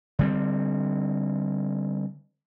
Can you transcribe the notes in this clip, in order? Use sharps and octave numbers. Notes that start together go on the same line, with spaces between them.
D3 G3 C4